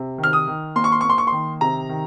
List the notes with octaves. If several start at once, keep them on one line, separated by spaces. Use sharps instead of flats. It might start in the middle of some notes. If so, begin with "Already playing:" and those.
Already playing: C3
D#3
F6
D#6
D#3
A#3 C6
C#6
C6
A#3 C#6
C6
C#6
D#3 C6
C3 A#5
D#3